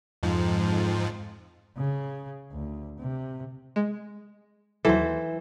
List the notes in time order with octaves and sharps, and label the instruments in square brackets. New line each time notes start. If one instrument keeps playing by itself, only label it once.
[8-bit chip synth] F2 G#2 F3
[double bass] C#3
D2
C3
[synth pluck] G#3
[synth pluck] D#2 F#3 A4 [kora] E3 C5